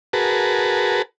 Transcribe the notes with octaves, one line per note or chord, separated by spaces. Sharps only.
F#4 G#4 A#4 B4 A5